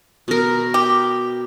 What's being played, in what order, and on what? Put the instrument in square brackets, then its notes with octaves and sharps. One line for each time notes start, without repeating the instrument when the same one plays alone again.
[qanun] B2 A#4
[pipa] G4